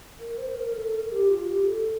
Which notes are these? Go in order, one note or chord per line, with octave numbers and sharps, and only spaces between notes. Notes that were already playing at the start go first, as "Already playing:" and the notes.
A#4
C5
A#4
A4
A#4
G4
F4
G4
A4